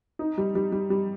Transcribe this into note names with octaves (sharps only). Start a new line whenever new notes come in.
D#4
G3
G3
G3
G3